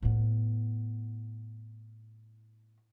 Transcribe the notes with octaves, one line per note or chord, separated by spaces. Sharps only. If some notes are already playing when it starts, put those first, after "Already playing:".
A2 B3